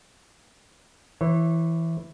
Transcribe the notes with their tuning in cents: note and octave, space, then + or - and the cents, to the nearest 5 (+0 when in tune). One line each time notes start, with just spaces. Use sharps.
E3 +0 C#5 -35